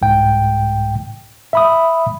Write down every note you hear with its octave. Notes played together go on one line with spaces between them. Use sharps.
C2 G#2 G5
E5 B5 D#6